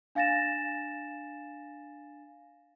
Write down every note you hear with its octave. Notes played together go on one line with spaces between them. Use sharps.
D4 F5 G#5 A6 A#6 E7